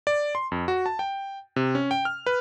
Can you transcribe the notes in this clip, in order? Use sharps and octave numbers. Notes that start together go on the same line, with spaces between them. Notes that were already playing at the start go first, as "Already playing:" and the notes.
D5
C6
F2
F#4
A5
G5
C3
C#4
G5
F6
B4